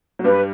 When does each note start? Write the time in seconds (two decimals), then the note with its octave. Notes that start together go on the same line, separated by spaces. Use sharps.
0.19 F#3
0.24 G2 G3 B4